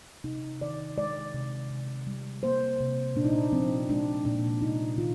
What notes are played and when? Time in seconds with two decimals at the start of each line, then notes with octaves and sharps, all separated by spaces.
0.24 C3 D#4
0.61 D#3 D5
0.98 G#3 D5
1.34 C3
1.71 C3
2.07 G3
2.43 A#3 C5
2.80 C3
3.16 A#2 D4
3.25 D#4
3.33 D4
3.52 F3 C4
3.89 G#3 D4
4.25 A#2 D4
4.62 C3 D#4
4.98 D#3 F4